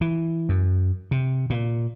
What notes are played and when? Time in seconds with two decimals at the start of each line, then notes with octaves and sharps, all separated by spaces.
0.01 E3
0.49 F#2
1.11 C3
1.50 A#2